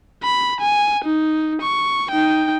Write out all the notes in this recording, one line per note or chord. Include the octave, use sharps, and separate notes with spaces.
B5
G#5
D#4
C#6
D#4 G5